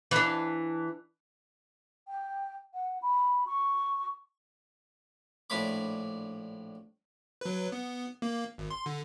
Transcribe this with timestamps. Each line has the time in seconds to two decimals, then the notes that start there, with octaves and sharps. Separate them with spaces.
0.11 E3 D4
2.08 G5
2.74 F#5
3.02 B5
3.47 C#6
5.50 A#1 A2 D4 C#5 B5 D6
7.41 F#3 B4
7.72 B3
8.22 A#3
8.58 G#1
8.70 C6
8.86 D3